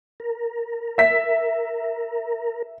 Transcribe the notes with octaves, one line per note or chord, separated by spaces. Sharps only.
A#4
E5 B6